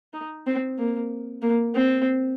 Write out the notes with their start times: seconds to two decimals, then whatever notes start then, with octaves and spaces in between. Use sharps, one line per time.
0.14 D#4
0.47 C4
0.78 A#3
1.42 A#3
1.75 C4